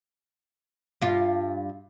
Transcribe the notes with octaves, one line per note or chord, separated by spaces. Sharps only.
G2 F4